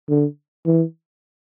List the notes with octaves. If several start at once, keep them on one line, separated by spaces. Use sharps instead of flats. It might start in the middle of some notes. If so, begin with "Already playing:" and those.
D3
E3